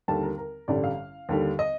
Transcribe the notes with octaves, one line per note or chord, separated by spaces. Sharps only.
D#2 D3 G3 A5
A#4
A#4
A1 G2 D3 G3 D5
F5
D#2 D3 G3
D#5